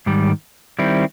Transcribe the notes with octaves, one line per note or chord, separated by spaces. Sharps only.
G#2 D#3 G3
D#3 G3 C4 E4